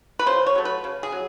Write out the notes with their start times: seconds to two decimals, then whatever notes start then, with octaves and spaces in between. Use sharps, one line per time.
0.19 B4
0.26 C#3 C5
0.47 C#5
0.55 F#3 A3
0.65 B4
0.84 C#3
1.03 G#4
1.12 F#3